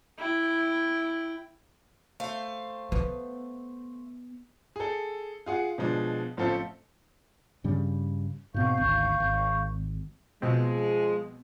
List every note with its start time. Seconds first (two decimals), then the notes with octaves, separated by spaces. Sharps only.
0.18 E4 G5
2.20 A3 C5 F5
2.92 B3
4.76 G#4 A4
5.46 F4 G#4 F#5
5.78 B2 F3 G#3 D4
6.37 A1 F3 A3 C4 A4 F5
7.64 G2 C#3 G3
8.54 G#2 B2 C4 F5 C#6 G6
8.78 G#1 D2
9.20 G#1
10.42 B2 F3 G#3 C4